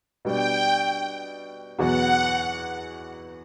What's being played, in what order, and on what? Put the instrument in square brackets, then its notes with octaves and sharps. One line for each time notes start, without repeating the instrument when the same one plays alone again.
[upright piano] B2 G3 D4 [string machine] G5
[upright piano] E2 B2 F#3 B3 F#4 [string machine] F#5